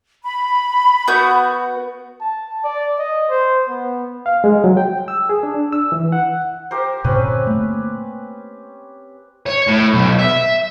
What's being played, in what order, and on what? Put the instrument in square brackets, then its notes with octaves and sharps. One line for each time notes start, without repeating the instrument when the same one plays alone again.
[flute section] B5
[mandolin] B3 F#4 G6
[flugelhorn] A5
D5
D#5
C5
B3
[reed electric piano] F5
G#3
F#3
G5
E6
G#4
D4
E6
E3
F#5
[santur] G4 A#4 C5
[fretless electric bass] G2 A#2 D3 [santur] C4 C#4 B4
[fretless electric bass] A3 A#3
[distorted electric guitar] C#5
A2
B1
E5